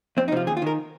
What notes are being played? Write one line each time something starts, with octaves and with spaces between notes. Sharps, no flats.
F2 C4
D#4
C3 F3 F4
D#2 G#4
F4
D#3 A#4